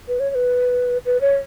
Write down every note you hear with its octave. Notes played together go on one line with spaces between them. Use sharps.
B4
C#5
C#5
B4
B4
C#5